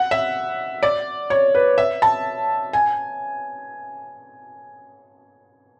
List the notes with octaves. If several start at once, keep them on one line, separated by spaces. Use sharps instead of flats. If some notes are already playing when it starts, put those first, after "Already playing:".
Already playing: F#5
E5
D5
C#5
B4
E5
A5
G#5